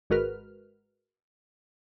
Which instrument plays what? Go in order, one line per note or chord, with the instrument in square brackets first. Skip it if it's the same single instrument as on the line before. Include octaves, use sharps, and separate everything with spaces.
[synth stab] G#1 G#3 F#4 A#4 B4 F6